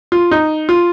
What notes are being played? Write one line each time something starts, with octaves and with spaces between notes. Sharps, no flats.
F4
D#4
F4